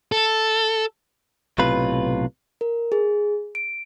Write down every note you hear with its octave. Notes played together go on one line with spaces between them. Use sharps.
A4
B1 A2 C3 F4 B4
A#4
G#4
D7